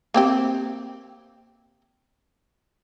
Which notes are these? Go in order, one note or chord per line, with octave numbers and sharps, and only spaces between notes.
A#3 C4 G4